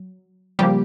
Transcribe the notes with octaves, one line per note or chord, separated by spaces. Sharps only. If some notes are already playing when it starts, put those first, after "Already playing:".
Already playing: F#3
C#3 F3 G3 A#3 G4